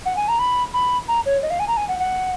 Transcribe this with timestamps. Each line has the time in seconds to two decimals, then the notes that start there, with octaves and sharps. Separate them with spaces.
0.06 F#5
0.17 G#5
0.28 A#5
0.39 B5
0.74 B5
1.08 A#5
1.26 C#5
1.43 D#5
1.50 F5
1.60 G#5
1.68 A#5
1.77 G#5
1.88 F#5
1.99 F#5